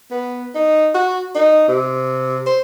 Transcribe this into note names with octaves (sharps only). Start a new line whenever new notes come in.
B3
D#4
F#4
D#4
C3
C5